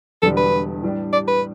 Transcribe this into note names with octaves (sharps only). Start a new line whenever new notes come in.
E1 E2 D3 G3 D4 A4
B4
A2 G3 D4 G4
D5
B4